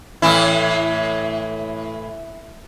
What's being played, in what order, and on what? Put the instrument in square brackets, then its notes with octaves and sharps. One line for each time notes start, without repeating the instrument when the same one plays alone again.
[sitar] A2 E3 E4